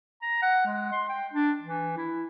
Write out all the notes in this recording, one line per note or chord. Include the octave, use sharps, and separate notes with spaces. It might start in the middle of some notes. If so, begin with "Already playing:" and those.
A#5
F#5
G#3
C6
G5
D4
E3
E4